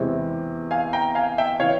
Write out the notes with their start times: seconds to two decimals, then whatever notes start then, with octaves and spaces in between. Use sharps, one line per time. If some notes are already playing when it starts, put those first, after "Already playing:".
Already playing: E2 C3 E3 G#3 C4
0.71 F5 G#5
0.93 G5 A#5
1.15 F5 G#5
1.38 E5 G5
1.60 E3 C#5 F5